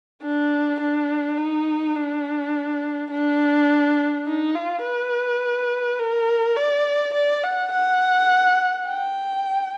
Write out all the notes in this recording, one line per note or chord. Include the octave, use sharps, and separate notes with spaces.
D4
D4
D#4
D4
D4
D#4
F4
B4
A#4
D5
D5
F#5
F#5
G5